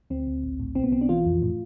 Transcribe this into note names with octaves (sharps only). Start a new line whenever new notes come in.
D2 C4
D2
A1
A2
B1 C4
B3
B1 C4
D4
E3 F4
F2
A2